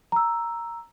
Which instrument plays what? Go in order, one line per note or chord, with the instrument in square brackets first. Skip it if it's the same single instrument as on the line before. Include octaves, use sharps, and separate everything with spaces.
[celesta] A#5 E6